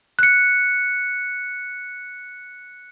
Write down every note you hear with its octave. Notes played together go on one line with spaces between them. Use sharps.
F#6 C#7